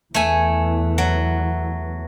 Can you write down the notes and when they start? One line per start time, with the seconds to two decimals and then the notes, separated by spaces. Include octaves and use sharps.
0.14 E2 E3 A3 G#5
0.98 F#3